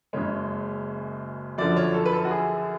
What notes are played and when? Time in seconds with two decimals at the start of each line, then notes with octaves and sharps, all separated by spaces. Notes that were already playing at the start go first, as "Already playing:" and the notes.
0.13 F#1 F#2 C#3 G#3 C#5
1.58 F#2 D3 F3 D5
1.76 C#5
1.94 A4
2.06 B4
2.13 A4
2.25 F#4
2.31 G#4